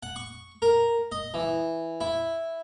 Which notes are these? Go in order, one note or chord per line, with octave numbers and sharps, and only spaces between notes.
F#5
C#6
A#4
D#5
E3
E4